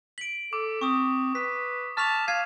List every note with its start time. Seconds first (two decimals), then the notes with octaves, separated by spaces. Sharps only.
0.18 B6 D7 F#7
0.53 A4 D6
0.81 C4 C#6 D#6
1.35 B4 B6
1.97 A5 C#6 D6 F6 B6 F7
2.28 F5 F6 G#6 C7 D#7